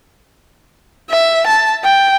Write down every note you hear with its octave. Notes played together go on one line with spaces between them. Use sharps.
E5
A5
G5